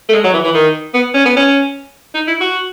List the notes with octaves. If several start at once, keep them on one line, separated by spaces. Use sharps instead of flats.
A3
G#3
F#3
E3
E3
D#3
B3
C#4
B3
C#4
D#4
E4
F#4